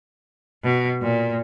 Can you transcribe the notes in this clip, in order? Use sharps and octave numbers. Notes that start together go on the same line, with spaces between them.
B2
A#2